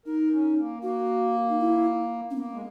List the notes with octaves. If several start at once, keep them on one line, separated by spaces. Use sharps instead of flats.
D#4 A#4
C#4
A#3
A#3 F#4
D#4
E4
C#4
A#3 B3
G#3